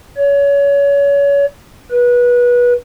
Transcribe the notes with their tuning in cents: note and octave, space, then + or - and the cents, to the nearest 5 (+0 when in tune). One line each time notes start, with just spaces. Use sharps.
C#5 +30
B4 -25